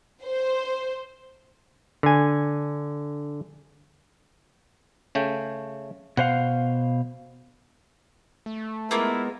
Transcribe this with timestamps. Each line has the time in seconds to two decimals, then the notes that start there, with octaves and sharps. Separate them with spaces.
0.24 C5
2.03 D3 G#5
5.15 C#3 A3 G5
6.17 B2 C5 F5 F#5
8.46 A3
8.91 G#3 A#3 B3 E4 F4 A#4